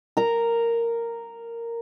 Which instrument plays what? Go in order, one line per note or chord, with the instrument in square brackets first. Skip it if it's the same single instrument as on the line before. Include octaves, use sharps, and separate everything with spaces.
[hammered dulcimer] A#4 A#5